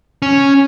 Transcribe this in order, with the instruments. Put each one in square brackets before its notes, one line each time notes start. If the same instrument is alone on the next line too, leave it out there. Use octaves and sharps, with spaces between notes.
[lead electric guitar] C#4